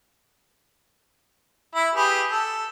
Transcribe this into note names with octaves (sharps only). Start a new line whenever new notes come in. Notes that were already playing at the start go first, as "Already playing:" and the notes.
E4
G4 G#4 B4
A4